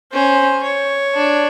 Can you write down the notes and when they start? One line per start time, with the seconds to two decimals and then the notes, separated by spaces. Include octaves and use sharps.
0.12 C#4 C5
0.63 C#5
1.14 D4